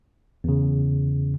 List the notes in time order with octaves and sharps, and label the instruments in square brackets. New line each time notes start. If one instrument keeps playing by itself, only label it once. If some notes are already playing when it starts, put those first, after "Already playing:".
[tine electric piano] E2 C#3